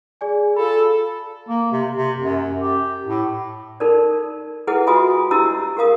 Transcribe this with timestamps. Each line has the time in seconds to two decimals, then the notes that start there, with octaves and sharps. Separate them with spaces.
0.21 G#4 D5 G#5
0.56 F4 A4 B5
1.49 A#3
1.72 C3
1.96 C3
2.19 F#2
2.59 G4
3.07 A2
3.80 D#4 A4 A#4 D5
4.67 E4 G#4 A4 B4 D#5 F#5
4.87 F4 F#4 E5 G#5 C6 D#6
5.31 D4 E4 G4 D#5 A#5 E6
5.77 G4 A#4 F5 D#6